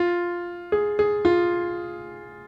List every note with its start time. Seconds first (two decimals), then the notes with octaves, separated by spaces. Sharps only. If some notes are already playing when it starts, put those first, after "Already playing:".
Already playing: F4
0.72 G#4
0.99 G#4
1.25 F4